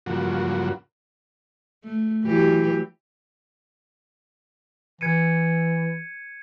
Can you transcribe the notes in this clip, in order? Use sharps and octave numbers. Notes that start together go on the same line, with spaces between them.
G2 C#3 F3 F#3 A#3 F#4
A3
E3 F#3 G4
E3 G#6 C#7 D#7